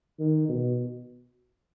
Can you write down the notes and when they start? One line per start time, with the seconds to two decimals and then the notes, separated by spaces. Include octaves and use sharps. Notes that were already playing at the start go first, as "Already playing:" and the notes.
0.19 D#3
0.49 B2